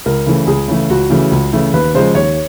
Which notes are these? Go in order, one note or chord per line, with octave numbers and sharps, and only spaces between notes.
C#2 A#4
C#3 E3 A3
C#2 G#4
C#3 E3 A3
C#2 F#4
C#3 E3 A3
C#2
C#3 E3 A3
D#2 B4
C#3 F3 G#3 C5
D#2 C#5